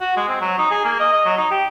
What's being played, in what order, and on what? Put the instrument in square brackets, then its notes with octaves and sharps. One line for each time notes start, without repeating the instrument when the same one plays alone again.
[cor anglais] F#4
G#3
C4
F#3
D#4
G#4
A#3
D#5
D#5
F#3
D#4
G4